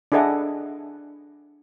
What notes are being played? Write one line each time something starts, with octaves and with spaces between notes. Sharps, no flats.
D4 E4 G#4 A4 D#5 F#5